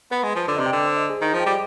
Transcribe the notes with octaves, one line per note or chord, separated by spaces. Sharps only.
B3 B4
G#3
F3
D3 D5
C3 D#5
G5
D3
C5
D#5
G#4
D#3 D#5
F3
G5
G3